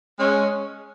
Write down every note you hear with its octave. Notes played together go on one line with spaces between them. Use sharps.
G#3 C#4